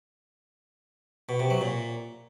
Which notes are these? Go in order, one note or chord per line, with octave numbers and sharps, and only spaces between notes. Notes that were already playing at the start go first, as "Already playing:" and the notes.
B2
C3
F#3
A#2